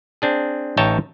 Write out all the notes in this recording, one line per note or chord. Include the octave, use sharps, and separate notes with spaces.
C4 D4 G#4
A1 D#4 C#5 E5 G5 A5